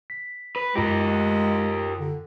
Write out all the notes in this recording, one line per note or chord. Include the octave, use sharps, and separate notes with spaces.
B6
B4
F#2 G#3 F4 G4 A#4 A#6
D3